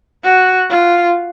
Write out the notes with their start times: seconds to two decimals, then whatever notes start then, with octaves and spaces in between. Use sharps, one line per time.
0.24 F#4
0.70 F4